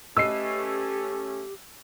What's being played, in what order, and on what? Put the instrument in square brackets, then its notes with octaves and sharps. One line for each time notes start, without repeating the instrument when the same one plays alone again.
[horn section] A3 C#4 [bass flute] G4 [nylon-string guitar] B4 D#5 [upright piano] E6 C7